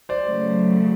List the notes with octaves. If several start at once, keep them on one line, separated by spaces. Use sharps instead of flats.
C5 D5
C#3 F#3 A3